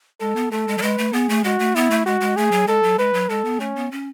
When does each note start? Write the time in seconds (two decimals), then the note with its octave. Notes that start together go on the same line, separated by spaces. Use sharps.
0.20 G#3 A4
0.36 B3
0.51 A3 A4
0.68 G#3
0.78 F#3
0.82 G#3 B4
0.98 A3
1.13 B3 G#4
1.29 A3
1.44 G#3 F#4
1.59 A3
1.75 B3 E4
1.90 A3
2.06 G#3 F#4
2.21 G#3
2.37 A3 G#4
2.52 F#3
2.67 G#3 A4
2.83 F#3
2.98 G#3 B4
3.14 F#3
3.29 G#3 A4
3.45 B3
3.60 A3 C#4
3.76 B3
3.91 C#4